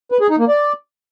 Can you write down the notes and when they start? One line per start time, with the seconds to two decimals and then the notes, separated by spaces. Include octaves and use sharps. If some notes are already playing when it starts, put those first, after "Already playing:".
0.12 B4
0.21 G#4
0.30 D#4
0.39 A#3
0.48 D5